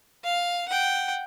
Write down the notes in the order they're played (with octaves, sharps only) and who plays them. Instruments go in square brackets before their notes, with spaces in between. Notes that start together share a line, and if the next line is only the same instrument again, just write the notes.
[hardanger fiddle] F5
F#5 G5